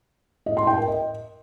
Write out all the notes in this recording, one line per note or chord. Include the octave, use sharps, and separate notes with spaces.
D#5
C6
G5
A#4
D#5